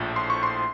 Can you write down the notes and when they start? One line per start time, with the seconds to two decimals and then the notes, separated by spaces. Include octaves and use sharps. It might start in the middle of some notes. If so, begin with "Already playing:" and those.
Already playing: A#1 A2 F3
0.16 C6
0.30 C#6
0.43 C6